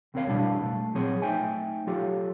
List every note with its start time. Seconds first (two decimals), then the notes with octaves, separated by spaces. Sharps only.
0.14 C#2 C4 A#4 C#5 F5
0.27 F#2 B2 G3 D4 E4 F5
0.63 A3
0.95 A#2 F#3 C4 G#4 C#5
1.22 A3 D#4 C5 E5 G5 G#5
1.87 F#3 F4 G4 A4 C#5 F5